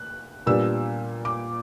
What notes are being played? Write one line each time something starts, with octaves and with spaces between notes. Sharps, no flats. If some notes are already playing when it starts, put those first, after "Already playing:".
Already playing: F#6
A#2 G3 B3 D4 E6
D6